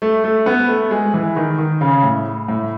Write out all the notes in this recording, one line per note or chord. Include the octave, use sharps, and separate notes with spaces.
A3
A3
B3
A3
G#3
E3
D#3
D#3
C#3
A2
A2